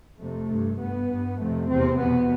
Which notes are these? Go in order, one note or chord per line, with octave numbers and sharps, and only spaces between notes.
F2 C3 A3
G2
G2 B3
G2
F2 C3 A3
E2 C3 C4
E2 B2 B3